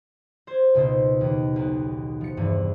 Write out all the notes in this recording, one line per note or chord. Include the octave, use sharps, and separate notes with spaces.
C5 G#6
C#2 B2 D#4 C5
D#2
B1
F3 C#7
E2 G2 C3